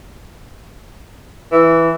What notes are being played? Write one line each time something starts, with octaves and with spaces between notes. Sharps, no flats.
E3